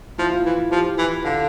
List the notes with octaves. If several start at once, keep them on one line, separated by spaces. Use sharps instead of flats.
F3 E4
F4
E3 E4
F3 G4
E3
D3 F5